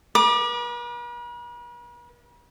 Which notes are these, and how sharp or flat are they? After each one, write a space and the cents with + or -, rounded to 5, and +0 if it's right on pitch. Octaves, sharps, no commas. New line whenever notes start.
B4 -45 D6 +25